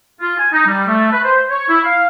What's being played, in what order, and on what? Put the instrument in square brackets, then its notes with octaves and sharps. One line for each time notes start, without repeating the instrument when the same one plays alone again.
[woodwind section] F4
G#5
D#4
G3
A3
B4
C5
C#5
E4
F5